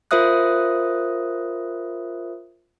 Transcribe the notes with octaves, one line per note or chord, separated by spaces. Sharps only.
F4 A#4 C5 E5 D#6 F#6